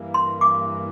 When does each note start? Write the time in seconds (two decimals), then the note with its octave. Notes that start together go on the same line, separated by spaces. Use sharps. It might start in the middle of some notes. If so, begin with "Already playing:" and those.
Already playing: G2 E3 A#3
0.14 C6
0.41 D6